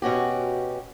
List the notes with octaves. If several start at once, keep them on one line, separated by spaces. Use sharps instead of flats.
B2 C#4 F#4 G4